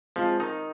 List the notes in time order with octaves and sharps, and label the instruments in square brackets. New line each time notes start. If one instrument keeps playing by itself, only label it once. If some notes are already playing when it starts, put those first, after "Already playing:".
[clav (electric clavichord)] F3 [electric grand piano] G#3 C4 F4
[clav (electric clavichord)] D#3 D#4